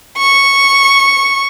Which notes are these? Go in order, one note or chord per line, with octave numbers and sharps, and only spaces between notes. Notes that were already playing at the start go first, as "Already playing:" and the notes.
C#6